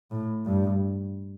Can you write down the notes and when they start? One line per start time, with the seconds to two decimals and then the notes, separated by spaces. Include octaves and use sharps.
0.11 A2
0.46 G2